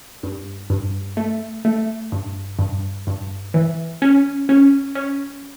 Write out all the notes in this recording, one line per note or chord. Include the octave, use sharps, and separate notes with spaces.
G2
G2
A3
A3
G2
G2
G2
E3
C#4
C#4
C#4